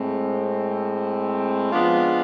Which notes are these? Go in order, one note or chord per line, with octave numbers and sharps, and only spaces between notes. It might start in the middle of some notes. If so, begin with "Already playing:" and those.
Already playing: A2 G#3 C4
F3 G#3 B3 D4 F4